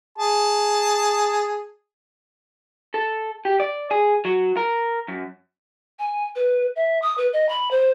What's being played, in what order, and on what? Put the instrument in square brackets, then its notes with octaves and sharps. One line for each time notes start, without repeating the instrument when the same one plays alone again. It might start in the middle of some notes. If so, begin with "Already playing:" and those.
[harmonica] G#4 A5
[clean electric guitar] A4
G4
D5
G#4
F#3
A#4
F#2
[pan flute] G#5
B4
E5
D#6
B4
D#5
B5
C5